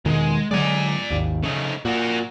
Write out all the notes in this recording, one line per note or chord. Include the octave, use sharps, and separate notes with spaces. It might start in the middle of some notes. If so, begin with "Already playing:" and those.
E2 B2 D#3 G#3
D3 F#3 G#3 D5 G#5
G#1 D#2
C#3 A3 D#4
A#2 F#4 A#4